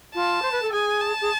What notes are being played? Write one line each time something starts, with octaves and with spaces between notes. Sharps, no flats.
F4 A5
C5
B4
A4
G#4 G#5
A5
G#4